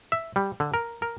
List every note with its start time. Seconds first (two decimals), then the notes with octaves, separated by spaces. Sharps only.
0.12 E5
0.36 G3
0.60 D3
0.74 A#4
1.02 A#4